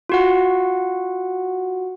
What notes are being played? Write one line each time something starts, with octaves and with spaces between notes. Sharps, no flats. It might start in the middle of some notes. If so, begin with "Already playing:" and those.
F4 F#4 F#5